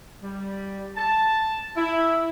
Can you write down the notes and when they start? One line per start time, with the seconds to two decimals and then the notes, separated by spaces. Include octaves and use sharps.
0.23 G3
0.96 A5
1.77 E4